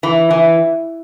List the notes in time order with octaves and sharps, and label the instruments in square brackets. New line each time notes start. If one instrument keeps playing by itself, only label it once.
[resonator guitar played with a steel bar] E3
E3